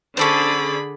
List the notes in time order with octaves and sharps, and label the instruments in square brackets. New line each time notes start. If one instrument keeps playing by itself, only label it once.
[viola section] D3 G#4 [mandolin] C#4 A4 C5 [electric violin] D5 B5